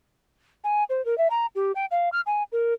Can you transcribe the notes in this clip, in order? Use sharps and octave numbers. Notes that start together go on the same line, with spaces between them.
G#5
C5
A#4
E5
A#5
G4
G5
F5
F6
G#5
A#4